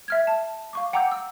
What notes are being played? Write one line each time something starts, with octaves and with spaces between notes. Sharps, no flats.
E5 F6 G#6
A5
F5 C#6 D6
F#5 G5 A#5 D6 E6 G6
E6